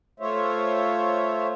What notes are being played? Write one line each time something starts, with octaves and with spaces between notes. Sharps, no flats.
A3 F4 C5 C#5 E5